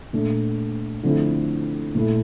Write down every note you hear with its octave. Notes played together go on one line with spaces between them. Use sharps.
A#2 A3 D4
D3 F3 A3 C4 E4
A#2 A3 E4